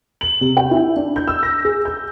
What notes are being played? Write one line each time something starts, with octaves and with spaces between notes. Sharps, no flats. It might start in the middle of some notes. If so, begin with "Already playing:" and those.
F#7
C3
G5
E4
D4
G6
E6
A#6
G#4
G6